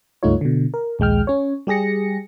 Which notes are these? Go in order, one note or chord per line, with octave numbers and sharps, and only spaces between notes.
C#2 G2 A3 D#4 F4 C#5
B2 D3
A#4
A#1 D#2 G#3 G5 F6
C#4 C#5
G3 G4 G#4 A#6 C#7